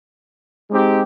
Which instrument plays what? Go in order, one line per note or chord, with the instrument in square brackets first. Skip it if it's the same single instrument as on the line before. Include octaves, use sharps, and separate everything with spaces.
[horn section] G#3 C4 D#4 G4